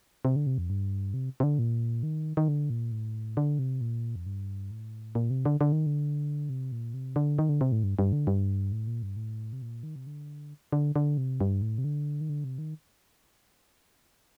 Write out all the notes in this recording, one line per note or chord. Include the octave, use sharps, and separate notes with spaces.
C3
D3
C3
F2
G2
C3
C3
D3
A#2
D#3
D#3
D3
A#2
A2
D3
C3
A#2
F2
G2
A2
A#2
C3
D3
D3
D#3
D3
C3
A#2
C3
D3
D#3
D3
C3
A2
G2
G2
D3
G2
A2
A#2
G2
A2
C3
A#2
D#3
C3
D3
D3
D3
C3
G2
A2
C3
D3
D#3
D3
C3
D#3